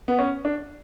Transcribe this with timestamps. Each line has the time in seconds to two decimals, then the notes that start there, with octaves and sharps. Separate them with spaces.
0.08 B3
0.19 C#4
0.45 D4